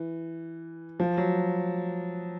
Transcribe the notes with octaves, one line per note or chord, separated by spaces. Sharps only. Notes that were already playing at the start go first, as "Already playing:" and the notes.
Already playing: E3
F3
F#3